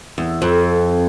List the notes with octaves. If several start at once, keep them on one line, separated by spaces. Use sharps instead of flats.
E2
F2